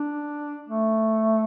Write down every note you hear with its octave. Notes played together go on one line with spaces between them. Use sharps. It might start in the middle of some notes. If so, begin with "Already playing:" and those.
Already playing: D4
A3